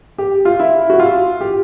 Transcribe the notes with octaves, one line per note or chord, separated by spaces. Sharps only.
G4
F4
E4
F#4
F4
G4